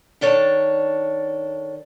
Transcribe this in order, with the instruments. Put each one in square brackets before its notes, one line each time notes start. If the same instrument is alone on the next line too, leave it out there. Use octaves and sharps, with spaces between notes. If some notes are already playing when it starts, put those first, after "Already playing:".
[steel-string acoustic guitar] D#3 D4 A4 C#5